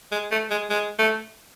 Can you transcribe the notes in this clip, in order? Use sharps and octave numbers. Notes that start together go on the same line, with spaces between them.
G#3
A3
G#3
G#3
A3